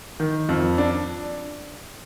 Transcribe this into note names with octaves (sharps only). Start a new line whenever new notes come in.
D#3
F2
D4